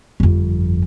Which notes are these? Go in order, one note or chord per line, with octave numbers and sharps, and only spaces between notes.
G1 F2